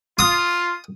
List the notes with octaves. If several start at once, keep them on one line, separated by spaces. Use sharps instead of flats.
F4 D#6